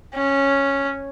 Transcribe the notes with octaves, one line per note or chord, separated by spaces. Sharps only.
C#4